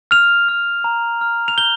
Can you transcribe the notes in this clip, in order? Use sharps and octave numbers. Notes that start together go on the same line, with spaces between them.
F6 F7
F6
A#5
F6
F7
G6 G7